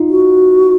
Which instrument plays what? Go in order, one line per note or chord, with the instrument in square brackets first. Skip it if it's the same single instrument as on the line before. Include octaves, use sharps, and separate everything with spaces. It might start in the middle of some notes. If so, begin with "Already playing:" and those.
Already playing: [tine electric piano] D#4 F4
[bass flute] F#4